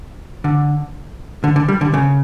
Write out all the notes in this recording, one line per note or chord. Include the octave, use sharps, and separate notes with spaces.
D3
D3
D3
G3
D3
C#3